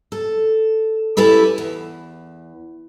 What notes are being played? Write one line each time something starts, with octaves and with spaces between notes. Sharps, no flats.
A4
C#4 E4 G4 A4 B4
E2